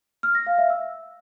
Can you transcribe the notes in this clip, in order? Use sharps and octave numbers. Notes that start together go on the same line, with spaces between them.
F6
A#6
F5
E5
E6